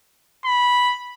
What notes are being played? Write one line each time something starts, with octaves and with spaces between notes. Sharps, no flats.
B5